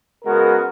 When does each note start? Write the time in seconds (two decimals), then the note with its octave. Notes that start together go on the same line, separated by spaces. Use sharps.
0.24 C#3 G#3 B3 F#4 A#4